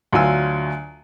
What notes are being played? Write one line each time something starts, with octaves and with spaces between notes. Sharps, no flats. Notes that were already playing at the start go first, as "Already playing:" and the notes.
D2 F#3 F4 G#5 E6